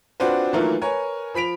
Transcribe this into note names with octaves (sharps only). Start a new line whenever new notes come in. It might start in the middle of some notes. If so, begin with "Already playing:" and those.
C4 D4 F4 F#4 B4 C5
D#3 E3 F#3 A3 A#3 F4
A#4 B4 C#5 G#5
F3 B5 B6 D7 F7